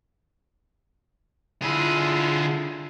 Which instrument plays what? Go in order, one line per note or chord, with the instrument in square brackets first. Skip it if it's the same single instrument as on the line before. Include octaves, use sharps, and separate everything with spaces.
[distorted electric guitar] D3 G#4 [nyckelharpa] E4 F4